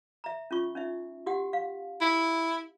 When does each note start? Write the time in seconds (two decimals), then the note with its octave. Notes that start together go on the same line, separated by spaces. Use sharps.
0.24 E5 A#5
0.51 C#4 F4 C#6
0.75 C#4 D#4 E5
1.26 F#4 G4 F#5
1.53 F5
2.01 E4